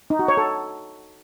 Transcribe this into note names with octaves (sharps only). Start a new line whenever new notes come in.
D#4
F#4
C#5
A4